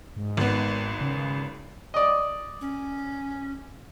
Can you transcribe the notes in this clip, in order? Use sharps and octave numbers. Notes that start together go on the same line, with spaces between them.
G#2
G#1 B3
C#3
D5 D#5
C#4